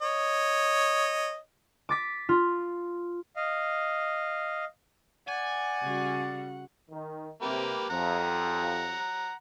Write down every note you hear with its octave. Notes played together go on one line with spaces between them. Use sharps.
C#5 D#5
D6 A6 B6
F4
D#5 F5
D5 F#5 G#5
C#3 G3 F#4
D#3
C3 A#3 G4 B4
F2 F#5 A#5